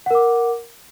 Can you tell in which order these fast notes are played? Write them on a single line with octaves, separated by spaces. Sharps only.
F#5 A#4 D6